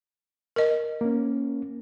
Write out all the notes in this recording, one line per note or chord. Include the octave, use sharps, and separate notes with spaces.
A#4 D#5
A#3 C#4